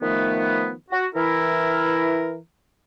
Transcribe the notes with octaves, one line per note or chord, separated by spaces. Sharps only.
D#3 F3 A3 B3
F#4
E3 E4 A#4